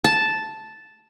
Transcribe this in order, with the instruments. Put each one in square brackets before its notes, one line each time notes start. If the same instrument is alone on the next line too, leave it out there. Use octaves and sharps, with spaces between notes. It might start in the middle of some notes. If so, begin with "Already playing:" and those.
[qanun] A5